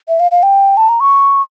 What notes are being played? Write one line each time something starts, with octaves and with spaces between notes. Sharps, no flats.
E5
F5
F5
G5
A5
A#5
C#6